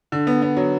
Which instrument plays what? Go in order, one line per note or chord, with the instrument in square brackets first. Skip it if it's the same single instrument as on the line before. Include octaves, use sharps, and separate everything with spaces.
[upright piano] D3
B3
B3
F#3